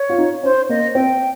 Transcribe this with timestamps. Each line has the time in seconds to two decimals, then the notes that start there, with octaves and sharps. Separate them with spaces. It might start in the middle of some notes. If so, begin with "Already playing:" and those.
Already playing: C#5
0.09 F4
0.18 D#4
0.43 C#4 C5
0.69 A#3 D#5
0.95 C4 G5